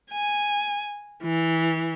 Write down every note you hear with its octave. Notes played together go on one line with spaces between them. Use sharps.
G#5
E3